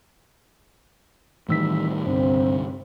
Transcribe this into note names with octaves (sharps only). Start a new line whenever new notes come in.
A2 D#3 E3 G3 E6 B6
C2 G2 D3 C4